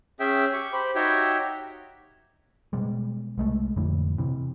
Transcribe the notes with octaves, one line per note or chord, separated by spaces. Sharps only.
C#4 G#4 E5 G5
G4 C#6
G4 C5 B5
D#4 F#4 G4 C#5 E5 G5
B2 G3 G#3
C2 G#3 A3
F2 A2 D3 E3
C3 E3